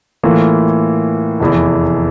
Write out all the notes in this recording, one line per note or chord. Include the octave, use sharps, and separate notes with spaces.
A2 E3 A#3 F4
F1 E2 E3